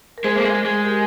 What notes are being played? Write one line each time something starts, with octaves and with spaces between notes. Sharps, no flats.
A#4
G#3 G#4 C5
A#3
G#3
G#3
G4 A#4